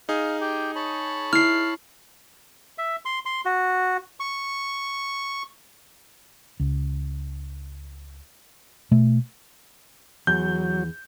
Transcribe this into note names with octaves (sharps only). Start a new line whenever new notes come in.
D#4 G#4 F5
G4 G5
C#5 A5 B5
E4 D5 F6 C7
E5
C6
C6
F#4
C#6
C#2
B2 A3
E2 F#3 G6